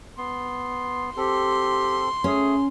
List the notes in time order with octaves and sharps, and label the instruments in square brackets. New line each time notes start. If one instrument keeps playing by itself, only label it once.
[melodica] B3 [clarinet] C6
[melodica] C4 A4 [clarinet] G4 [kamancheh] C6
[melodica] A3 [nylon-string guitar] C#4 [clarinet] G#4